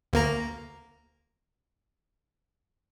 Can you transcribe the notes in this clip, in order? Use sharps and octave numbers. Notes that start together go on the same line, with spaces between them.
D2 A#3 A#5